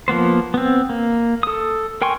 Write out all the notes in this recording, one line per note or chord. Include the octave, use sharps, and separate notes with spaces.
F3 A#3 B3 C5
B3 C4
A#3
A4 D#6
A#4 G5 G#5 C6 C#6